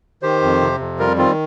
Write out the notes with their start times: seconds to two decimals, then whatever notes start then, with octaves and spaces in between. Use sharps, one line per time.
0.23 D#3 G4 C5
0.42 F2
0.61 C3
0.79 F2
0.99 G3 F4 A#4
1.18 D#3 C4 F4